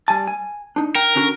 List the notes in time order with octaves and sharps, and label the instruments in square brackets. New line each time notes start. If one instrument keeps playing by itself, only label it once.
[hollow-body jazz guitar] G3 G#5 A5
G#5
D4 D#4
[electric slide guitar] A#4 [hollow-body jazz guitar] G5
[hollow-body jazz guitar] D3 C#4 F#4